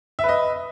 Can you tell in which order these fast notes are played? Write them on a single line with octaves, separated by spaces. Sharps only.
E5 B4 D#5